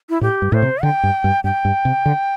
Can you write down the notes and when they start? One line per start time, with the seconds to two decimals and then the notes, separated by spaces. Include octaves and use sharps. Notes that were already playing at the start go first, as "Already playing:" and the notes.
0.10 E4
0.21 A2 G4
0.42 G2
0.52 A2 C5
0.62 C3
0.83 D3 G5
1.03 G2
1.24 G2
1.44 G2 G5
1.65 G2
1.85 C3
2.06 D3